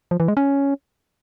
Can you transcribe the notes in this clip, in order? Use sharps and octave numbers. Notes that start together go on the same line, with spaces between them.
F3
E3
G#3
C#4